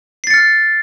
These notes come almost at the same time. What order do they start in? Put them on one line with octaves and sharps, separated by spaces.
C7 A6 C#7 F6